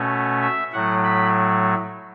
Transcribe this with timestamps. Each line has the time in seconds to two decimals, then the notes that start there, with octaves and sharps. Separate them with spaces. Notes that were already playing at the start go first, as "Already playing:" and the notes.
Already playing: B2 A3 C#4
0.42 E5
0.73 A2 F#3 A3 F#5
1.04 B5